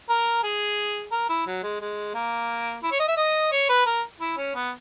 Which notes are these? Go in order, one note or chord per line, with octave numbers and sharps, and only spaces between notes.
A#4
G#4
A#4
E4
F#3
G#3
G#3
A#3
E4
C#5
D#5
E5
D#5
C#5
B4
A#4
E4
C#4
B3